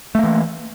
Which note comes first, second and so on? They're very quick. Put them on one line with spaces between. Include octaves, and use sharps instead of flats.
A3 A#3 E3